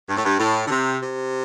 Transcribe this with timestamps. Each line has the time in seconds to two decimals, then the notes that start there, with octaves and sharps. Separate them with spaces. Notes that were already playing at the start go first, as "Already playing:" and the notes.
0.09 G2
0.16 A2
0.25 G2
0.39 A2
0.66 D3
0.70 C3
1.01 C3